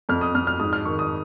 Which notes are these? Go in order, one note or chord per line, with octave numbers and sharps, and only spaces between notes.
F2 F6
D#6
F2 F6
F6
G#2 D#6
F6
D#3 C#6
D#6